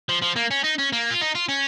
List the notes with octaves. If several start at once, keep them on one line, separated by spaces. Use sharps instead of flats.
F3
F3
A#3
C#4
D#4
C#4
A#3
F4
D#4
F4
C#4